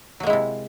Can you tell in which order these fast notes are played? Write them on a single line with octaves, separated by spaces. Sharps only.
F#3 A#3 G#3 E4 C3